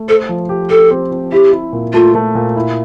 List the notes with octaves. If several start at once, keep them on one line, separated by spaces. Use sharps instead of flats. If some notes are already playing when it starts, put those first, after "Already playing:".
Already playing: A3
A4 C5
F3
G4
G4 A4
C4
C4
E4 G4
E4
A#2
A3 F4
A3
A#2
E4